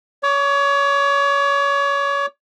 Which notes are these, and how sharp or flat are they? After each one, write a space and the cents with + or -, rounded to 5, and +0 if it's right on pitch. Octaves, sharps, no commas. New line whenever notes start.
C#5 +25 D6 +0